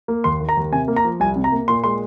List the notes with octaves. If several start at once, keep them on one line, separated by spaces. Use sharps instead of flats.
A#3
D#2 C6
D#3
A#5
D#2
C3 G#5
A#3
A#5
F3
C2 G#5
C3
A#5
A#3
A#2 C6
G#3 C6